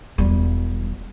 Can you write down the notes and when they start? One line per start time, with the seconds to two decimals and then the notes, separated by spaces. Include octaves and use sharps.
0.18 E1 G3